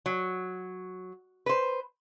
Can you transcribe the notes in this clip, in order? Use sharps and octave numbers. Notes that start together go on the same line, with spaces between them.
F#3
B4 C5